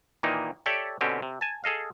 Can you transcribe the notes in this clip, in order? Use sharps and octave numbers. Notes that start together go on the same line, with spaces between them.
A#2 D#3 E3 A#3 D#4
G4 A4 C#5 D5 E5 G5
B2 D3 C4 C#4 G4
C3
G#5 A5
G#4 A4 D#5 F5